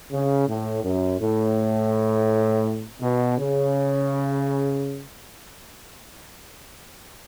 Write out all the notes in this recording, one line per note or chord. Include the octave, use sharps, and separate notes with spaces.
C#3
A2
F#2
A2
B2
C#3